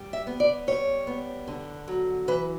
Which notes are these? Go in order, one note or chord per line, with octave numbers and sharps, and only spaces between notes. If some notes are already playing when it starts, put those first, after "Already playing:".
Already playing: G3
E5
B3
D5
G3 C#5
B3
D3
F#3
E3 B4